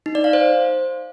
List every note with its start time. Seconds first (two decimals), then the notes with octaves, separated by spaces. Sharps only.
0.06 D#4
0.15 D5
0.24 F5
0.33 C5